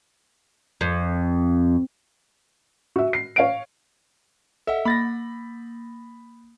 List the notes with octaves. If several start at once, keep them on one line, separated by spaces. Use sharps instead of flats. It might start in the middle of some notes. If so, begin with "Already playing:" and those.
F2
F#4 E5
C7
C#5 F5 D7
A4 D#5 E5 F#5
A#3 B5 A6 A#6